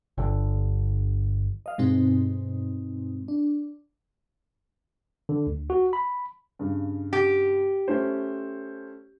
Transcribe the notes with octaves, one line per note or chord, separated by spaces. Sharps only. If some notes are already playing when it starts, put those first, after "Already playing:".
G1 D3
D#5 F5
G2 B2 G#3 C4 D#4
D4
D3
D2
F#4
B5
G2 C#3
G4
A3 C#4 C5